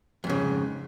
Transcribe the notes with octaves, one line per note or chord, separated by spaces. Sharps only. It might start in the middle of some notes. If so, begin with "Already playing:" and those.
F2 G#2 C#3